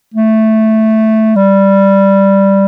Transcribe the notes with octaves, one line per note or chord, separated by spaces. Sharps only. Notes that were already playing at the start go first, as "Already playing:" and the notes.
A3
G3